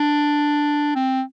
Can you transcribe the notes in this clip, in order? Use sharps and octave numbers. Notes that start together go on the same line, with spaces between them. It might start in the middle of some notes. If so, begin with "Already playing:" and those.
Already playing: D4
C4